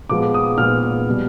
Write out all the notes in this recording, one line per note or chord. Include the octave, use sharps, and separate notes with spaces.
A#2 F3 G#3 B3 D6
D#6
A#2 F3 G#3 B3 F6
B2 G3